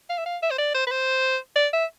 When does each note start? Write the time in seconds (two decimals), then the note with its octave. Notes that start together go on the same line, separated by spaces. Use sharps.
0.10 F5
0.18 E5
0.26 F5
0.42 E5
0.51 C5
0.58 D5
0.74 C5
0.87 B4
0.91 C5
1.56 D5
1.73 E5